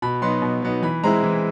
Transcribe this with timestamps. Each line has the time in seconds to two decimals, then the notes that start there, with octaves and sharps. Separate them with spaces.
0.02 B2 B5
0.21 F#3 B3 D#4 C6
0.42 B2
0.62 F#3 B3 D#4
0.82 E3 B5
1.04 G#3 C4 E4 A#5
1.23 E3